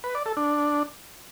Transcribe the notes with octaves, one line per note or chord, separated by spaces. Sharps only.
B4
D5
A4
D4